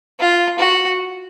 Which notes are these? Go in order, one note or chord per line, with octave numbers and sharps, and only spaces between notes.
F4
F#4